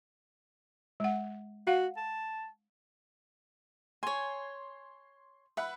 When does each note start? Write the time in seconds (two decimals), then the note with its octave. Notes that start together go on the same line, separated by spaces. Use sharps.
1.00 G#3 F#5
1.67 F#4 F5 F#5
1.97 A5
4.03 C#5 G#5 C6
5.57 B4 E5 F#5 B5